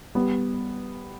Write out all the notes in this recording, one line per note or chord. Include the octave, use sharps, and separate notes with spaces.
G3 B3